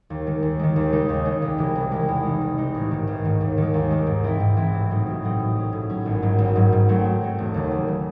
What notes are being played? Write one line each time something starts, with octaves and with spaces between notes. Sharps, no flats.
D#2
D#3 G#3
D#2
D#3 G#3
D#2
C#3 G#3 D#4
D#2
C#3 G#3 D#4
C2
C3 E3 G#3
C2
C3 E3 G#3
E2
C3 E3 G#3 D#4
E2
C3 E3 G#3 D#4
A1
G#2 D#3
A1
G#2 D#3
D#2
D#3 G#3
D#2
D#3 G#3
G#2
E3 C4 E4
G#2
E3 C4 E4
A1
A2 F#3 C4 D#4
A1
A2 F#3 C4 D#4
A2
F#3 C#4
A2
F#3 C#4
G#1
G#2 F#3
G#1
G#2 F#3
G#2
F#3 A3 C4
G#2
F#3 A3 C4
E1
D#2 C#3 F#3
E1
C#3 F#3